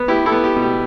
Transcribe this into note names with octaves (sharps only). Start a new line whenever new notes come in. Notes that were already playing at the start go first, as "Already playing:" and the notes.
Already playing: B3
E4 G4 B4
E4 A4
B3
G4
B2
G4